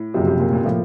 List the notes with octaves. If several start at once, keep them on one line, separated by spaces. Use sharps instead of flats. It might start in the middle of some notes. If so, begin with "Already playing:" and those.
Already playing: A2
F#1 F#2 C3 F3
C3
A#2
A#2
A2 F3 A#3